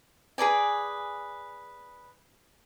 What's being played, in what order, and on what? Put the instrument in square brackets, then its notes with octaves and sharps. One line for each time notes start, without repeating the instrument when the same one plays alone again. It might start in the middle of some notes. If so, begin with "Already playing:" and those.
[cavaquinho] G#4 B4 D5 G#5